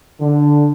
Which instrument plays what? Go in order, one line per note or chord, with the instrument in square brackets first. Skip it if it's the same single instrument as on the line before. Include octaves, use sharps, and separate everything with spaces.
[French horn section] D3